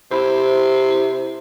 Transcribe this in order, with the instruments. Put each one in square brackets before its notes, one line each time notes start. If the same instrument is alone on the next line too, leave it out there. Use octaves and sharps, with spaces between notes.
[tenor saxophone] C3 [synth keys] E4 C5